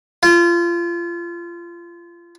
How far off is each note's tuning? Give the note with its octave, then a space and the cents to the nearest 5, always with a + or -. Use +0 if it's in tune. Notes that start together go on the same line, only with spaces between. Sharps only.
F4 -25